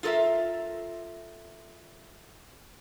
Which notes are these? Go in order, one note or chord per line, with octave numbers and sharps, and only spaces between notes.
F4 A4 A#4 D5 E5